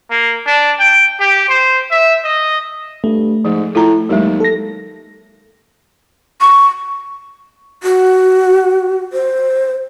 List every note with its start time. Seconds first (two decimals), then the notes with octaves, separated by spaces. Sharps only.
0.11 A#3
0.46 D4
0.79 G5
1.20 G4
1.49 C5
1.91 E5
2.24 D#5
3.04 G2 A3
3.45 G#2 F3
3.75 A2 F4 A#5
4.09 D#2 F#3 G#3
4.40 A4 A#6
6.41 C#6
7.83 F#4
9.13 C5